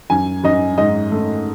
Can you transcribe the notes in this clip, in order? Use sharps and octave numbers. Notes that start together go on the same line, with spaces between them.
F#2 G#5
F#2 D#5
G#2 D#5
A3